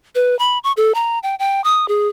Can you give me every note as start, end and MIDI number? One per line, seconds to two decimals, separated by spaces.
0.15 0.37 71
0.39 0.59 83
0.64 0.72 85
0.77 0.92 69
0.95 1.19 82
1.23 1.35 79
1.39 1.63 79
1.64 1.88 87
1.88 2.08 68